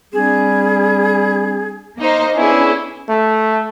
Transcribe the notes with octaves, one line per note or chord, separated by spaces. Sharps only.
G3 C4 D4 G#4
A#3 D#4 C5
B3 C#4 D4 E4 G#4
A3